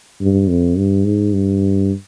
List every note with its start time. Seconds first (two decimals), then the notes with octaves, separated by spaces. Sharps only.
0.21 G2
0.49 F2
0.77 G2
1.05 G#2
1.33 G2